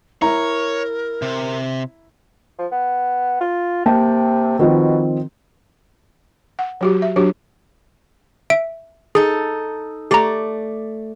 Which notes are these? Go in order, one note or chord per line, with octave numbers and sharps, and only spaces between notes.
E4 A#4 C#5 A#5
C3
F3
B3
F4
C3 A#3 G5 A5
B2 D#3 F3 C4
F#5
F#3 F#4 G4
E5
F#3 D4 F#4 G4
E5 D7
D#4 G#4 A4
A3 G4 D5 A#5